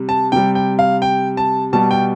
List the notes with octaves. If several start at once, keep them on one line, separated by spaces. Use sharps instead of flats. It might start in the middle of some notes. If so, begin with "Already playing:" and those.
Already playing: C3 G3
A5
C3 G3 G5
G5
F5
G5
A5
B2 G3 A5
G5